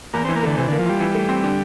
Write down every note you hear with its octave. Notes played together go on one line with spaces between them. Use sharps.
E2 A#3
E3 C4
A#3
D3 A3
C3 E3
D3 A#3
F3
G3 F4
E3
A3
C4
D3